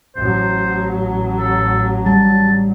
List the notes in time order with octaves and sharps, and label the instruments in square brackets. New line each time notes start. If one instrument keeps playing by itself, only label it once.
[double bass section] A1 F#3 [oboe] C5
[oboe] A4
[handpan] G3 [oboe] A5